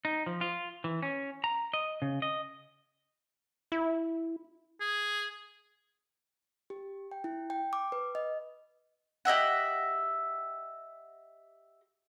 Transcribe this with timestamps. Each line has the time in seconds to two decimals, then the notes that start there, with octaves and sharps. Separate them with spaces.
0.05 D#4
0.26 F3
0.41 F4
0.84 E3
1.02 C#4
1.44 A#5
1.74 D#5
2.02 C#3
2.22 D#5
3.72 E4
4.81 G#4
6.70 G4
7.12 G5
7.24 E4
7.50 G5
7.73 D6
7.92 B4
8.15 D#5
9.25 G4 D#5 E5 F#5